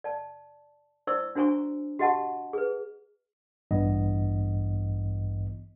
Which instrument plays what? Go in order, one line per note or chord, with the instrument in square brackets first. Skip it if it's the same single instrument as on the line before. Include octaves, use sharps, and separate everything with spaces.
[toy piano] D5 A5
E4 C5 D5 C#6 E6
D4 F#4 C5 G#5 A#5 C#6
F#4 G4 D#5 F#5 A5
G#4 B4
[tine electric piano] A1 G2 E3 B3 D#5